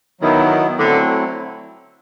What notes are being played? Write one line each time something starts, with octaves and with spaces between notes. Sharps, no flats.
D#3 F#3 B3 E4
D3 F#3 A3 C4 E4